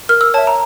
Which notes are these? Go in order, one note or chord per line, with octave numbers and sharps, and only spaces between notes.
A#4 F6
E6
C#5 E5 A5
A#5